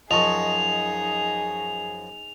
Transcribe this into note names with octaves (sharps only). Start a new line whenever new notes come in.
F#2 F3 D#4 G#4 D#5 A5 C#6 F7